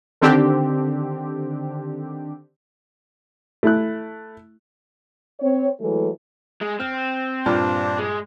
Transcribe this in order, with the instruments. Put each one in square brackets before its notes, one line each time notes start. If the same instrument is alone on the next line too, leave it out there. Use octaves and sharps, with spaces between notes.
[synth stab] D3 D#3 C4 D4 G4
[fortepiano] A3 E4 F#6
[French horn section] C4 C#5
E3 F#3 G#3 A3 E4 A4
[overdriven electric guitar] G#3
[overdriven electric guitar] C4 [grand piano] F6
[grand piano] G2 A#2 F4 [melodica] D4
[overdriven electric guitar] G#3